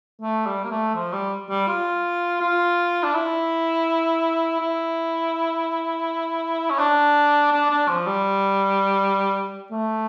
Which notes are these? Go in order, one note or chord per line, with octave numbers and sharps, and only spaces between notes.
A3
G3
A#3
A3
F3
G3
G3
F4
F4
D4
E4
E4
C#4
D4
D4
D4
F3
G3
A3